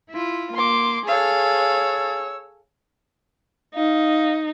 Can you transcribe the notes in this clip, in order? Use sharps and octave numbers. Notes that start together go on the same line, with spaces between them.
E4 F4
A#3 C6 D6
G#4 A4 C#5 F5 E6
D#4 F5